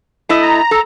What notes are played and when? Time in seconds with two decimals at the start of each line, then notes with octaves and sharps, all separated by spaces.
0.29 A3 E4 D#5
0.42 A#5
0.71 A4